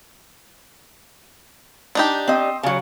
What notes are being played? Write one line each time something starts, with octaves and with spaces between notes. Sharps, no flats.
D4 D#4 G4
C4 D#5
C#3 F#3